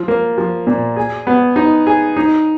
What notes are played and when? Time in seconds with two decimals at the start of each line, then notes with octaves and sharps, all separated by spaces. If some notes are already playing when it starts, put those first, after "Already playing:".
Already playing: F3
0.08 A#3
0.38 F3
0.67 A#2
0.96 G#4
1.27 B3
1.56 D#4
1.87 G#4
2.16 D#4